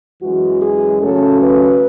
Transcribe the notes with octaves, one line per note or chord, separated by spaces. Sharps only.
F#2 E3 G#3 F#4
G#4
C#3 F#3 A3 C#4 A4
B4